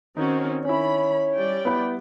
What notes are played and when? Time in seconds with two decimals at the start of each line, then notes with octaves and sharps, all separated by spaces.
0.17 D#3 C4 C#4 D#4 F#4
0.65 D#3 C#4 E4 C#5 B5
1.36 G3 D5 G5
1.65 B3 E4 B5